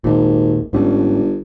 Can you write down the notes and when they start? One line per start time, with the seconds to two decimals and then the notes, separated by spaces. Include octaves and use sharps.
0.04 G#1 D#2 A#2
0.73 G1 G#2 C4 C#4